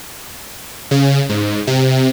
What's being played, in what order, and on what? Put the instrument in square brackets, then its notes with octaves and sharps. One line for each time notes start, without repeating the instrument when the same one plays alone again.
[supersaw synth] C#3
G#2
C3